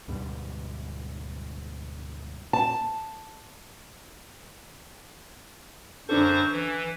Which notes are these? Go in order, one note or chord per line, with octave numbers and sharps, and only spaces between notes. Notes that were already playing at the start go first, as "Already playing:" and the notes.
D2 G#2 B2 G3
A5
F#2 D3 D4 A4 C5 C#6
E3